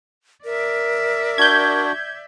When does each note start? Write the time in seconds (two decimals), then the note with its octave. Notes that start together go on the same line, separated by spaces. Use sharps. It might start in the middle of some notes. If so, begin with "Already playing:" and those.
0.45 A#4 D5 E5
1.38 D4 F#4 G6 G#6